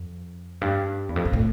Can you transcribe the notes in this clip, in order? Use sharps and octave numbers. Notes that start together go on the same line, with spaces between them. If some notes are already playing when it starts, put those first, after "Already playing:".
Already playing: F2
G2
E2
F2
G2
A2